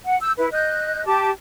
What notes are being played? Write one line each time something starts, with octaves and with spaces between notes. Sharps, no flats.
F#5
E6 G6
E4 B4
D#5 F#6 G6
G4 A5 D6